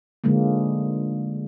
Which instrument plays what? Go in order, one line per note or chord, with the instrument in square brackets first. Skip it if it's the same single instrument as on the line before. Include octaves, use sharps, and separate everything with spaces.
[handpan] D3 F3 G#3 A#3